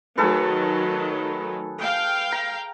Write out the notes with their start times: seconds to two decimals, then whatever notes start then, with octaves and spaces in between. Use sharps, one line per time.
0.18 D#3 F#3 A3 G#4 A4 B4
1.81 F5 G5
2.32 A#5